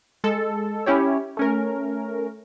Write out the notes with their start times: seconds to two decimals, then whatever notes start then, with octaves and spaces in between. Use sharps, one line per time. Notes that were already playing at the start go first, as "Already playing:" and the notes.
0.24 G#3 A4
0.86 C#4 E4 G4 C#5
1.37 A3 C#4 A#4